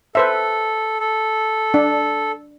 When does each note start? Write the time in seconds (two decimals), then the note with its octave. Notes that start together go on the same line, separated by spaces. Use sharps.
0.15 A4 B4 C5 E5
1.00 A4
1.74 D4